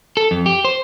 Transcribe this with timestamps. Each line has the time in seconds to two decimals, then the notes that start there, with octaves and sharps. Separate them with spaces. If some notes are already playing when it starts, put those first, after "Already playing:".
0.17 A4
0.31 F2
0.46 G4
0.65 C5